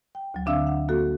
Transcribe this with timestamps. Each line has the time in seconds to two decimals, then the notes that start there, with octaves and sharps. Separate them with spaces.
0.15 G5
0.34 D2 F#3
0.46 D3 C4 D4 E5 F5 E6
0.67 F#5
0.89 A#3 F#4 A4